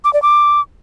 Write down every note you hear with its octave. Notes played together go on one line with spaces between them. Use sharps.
D6
D5
D6